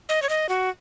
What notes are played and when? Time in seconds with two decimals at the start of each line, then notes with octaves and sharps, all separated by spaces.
0.09 D#5
0.22 C#5
0.29 D#5
0.49 F#4